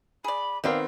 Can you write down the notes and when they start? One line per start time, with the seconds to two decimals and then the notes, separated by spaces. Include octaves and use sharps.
0.24 G#4 D5 B5
0.64 D#3 B3 C4 D#4 D5 F5 G5